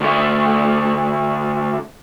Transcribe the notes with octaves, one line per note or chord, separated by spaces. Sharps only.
D2 A3